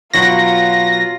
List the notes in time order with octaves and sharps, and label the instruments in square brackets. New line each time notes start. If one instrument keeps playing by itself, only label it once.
[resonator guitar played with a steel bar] B2 F#3 F#5 [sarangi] F4 [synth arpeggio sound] A#6